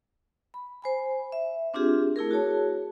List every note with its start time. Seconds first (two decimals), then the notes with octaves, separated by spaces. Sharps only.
0.54 B5
0.82 C5 G#5 B5
1.32 E5
1.74 C4 D4 F4 G4 G#4
2.16 A3 E4 G#4 A#4
2.31 F#4 G#4 C#5 A5